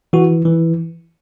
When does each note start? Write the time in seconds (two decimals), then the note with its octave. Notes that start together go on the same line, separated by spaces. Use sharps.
0.13 E3 F#4
0.45 E3